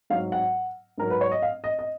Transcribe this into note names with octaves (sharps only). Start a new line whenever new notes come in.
G#2 F#3 F5
F#5
G#2 F#3 A#4
B4
C#5
D#5
F5
D#5
D#5